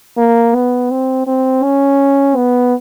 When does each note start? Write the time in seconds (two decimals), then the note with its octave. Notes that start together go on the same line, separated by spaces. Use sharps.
0.17 A#3
0.55 B3
0.91 C4
1.27 C4
1.63 C#4
2.36 B3